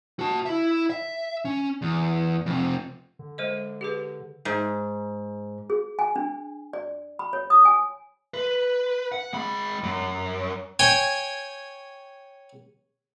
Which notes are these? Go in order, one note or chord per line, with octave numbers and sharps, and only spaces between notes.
F#4 A5
E4 E5
E5
C#4
E2
F2 C3
D3
G#3 C5 D#5
G4 G#4 B4
G#2
G#4
G#5
D4
D5
B5
C#5
D#6
G#5
B4
F#5
G#3 B5
F#2
C#5 G5 G#5